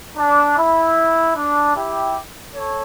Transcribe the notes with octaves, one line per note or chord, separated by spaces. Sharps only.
D4
E4
D4
E4 G4
A4 C#5